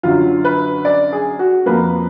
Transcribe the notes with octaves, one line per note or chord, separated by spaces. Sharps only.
F#2 D3 F#3 F4
B4
D5
G#4
F#4
F2 F3 A#3 B4